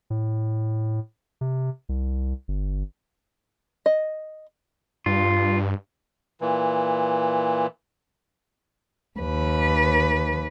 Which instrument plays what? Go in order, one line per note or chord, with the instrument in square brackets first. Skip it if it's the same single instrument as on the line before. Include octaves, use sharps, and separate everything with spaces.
[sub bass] A2
C3
C2
G1
[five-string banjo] D#5
[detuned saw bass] G2 [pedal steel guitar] F4
[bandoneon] A#2 E3
[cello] D#2 B4